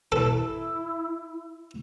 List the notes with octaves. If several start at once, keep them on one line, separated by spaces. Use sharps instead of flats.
E4 A4